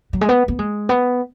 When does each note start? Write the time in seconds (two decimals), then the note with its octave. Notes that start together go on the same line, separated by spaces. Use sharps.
0.13 F#3
0.21 G#3
0.29 B3
0.48 B3
0.59 G#3
0.89 B3